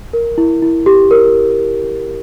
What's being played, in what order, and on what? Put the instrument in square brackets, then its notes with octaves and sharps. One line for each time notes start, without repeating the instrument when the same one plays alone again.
[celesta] A#4
E4
E4
G4
A#4